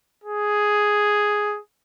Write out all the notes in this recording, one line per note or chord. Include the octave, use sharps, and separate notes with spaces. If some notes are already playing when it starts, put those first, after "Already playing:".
G#4